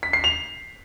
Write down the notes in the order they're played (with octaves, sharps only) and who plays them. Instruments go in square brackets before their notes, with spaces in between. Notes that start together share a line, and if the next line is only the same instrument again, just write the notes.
[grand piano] B6
C7
F7